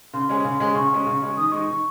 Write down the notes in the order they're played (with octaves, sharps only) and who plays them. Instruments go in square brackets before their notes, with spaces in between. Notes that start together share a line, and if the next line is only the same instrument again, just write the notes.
[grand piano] C#3 [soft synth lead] C6
[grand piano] G#3 C#4 G#4
C#3
G#3 C#4 G#4
[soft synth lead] C6
[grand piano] C#3 [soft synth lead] C#6
[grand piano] G#3 C#4 G#4
C#3
G#3 C#4 G#4
[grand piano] D#3 [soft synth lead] D#6
[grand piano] G#3 D#4 [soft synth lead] C#6
[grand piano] D#3